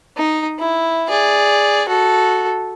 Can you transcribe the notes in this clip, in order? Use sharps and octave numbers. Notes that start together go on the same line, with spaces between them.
D#4
E4
G#4 D5
F#4 A4